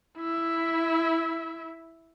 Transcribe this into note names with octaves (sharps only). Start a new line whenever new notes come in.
E4 E5